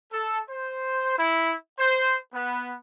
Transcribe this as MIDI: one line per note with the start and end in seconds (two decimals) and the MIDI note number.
0.13 0.39 69
0.50 1.17 72
1.18 1.54 64
1.79 2.18 72
2.34 2.75 59